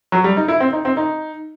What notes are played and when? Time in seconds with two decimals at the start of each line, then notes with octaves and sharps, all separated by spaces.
0.12 F#3
0.24 G3
0.37 D#4
0.48 E4
0.60 C4
0.73 D#4
0.85 C4
0.97 D#4